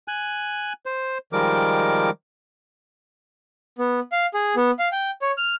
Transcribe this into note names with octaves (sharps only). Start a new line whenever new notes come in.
G#5 F#6
C5
D#3 F3 G3 G#3 A#4 D6
B3
F5
G#4
B3
F5
G5
C#5
F6